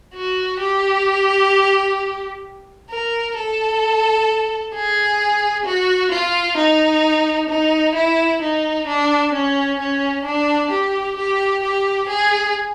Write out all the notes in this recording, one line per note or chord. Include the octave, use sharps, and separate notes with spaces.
F#4
G4
A#4
A4
G#4
F#4
F4
D#4
D#4
E4
D#4
D4
C#4
C#4
D4
G4
G4
G4
G#4